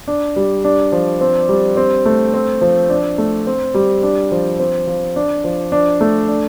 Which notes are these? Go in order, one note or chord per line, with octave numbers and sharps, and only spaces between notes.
D4
G3
D4
F3
C4
G3
C4
A3
C4
F3
D4
A3
C4
G3
D4
F3
C4
F3
D4
F3
D4
A3
D4